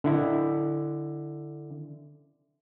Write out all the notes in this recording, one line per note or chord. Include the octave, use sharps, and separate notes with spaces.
D3 E4